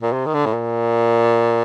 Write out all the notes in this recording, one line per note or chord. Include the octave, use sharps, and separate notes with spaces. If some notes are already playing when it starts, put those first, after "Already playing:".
A#2
C3
D#3
D3
A2
A#2